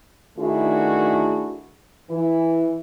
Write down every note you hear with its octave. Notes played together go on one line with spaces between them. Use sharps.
D#3 A3 D4 E4 F#4 G#4
E3 E4